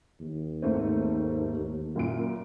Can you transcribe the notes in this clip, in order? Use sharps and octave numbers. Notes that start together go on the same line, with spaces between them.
D#2
G#2 A3 C4
F#2 A#2 D7